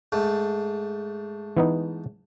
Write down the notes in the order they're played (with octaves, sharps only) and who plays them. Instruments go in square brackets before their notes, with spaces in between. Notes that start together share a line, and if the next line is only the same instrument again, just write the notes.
[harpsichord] G#2 A3
[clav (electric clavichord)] E3 B3 D#4